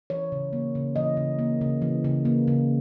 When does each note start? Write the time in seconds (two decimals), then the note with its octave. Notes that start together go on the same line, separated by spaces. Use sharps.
0.10 E3 C#5
0.32 C#3
0.53 A#3
0.75 C#3
0.96 E3 D#5
1.17 C#3
1.39 A#3
1.61 C#3
1.82 E3
2.04 C#3
2.25 A#3
2.48 C#3